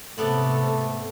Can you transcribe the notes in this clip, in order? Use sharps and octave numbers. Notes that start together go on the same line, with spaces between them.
G#2 C3 A3 B3 A4 D5